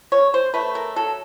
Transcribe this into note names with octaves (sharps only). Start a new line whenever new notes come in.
C#3 C#5
C5
A3 B4
A#4
F#3 A4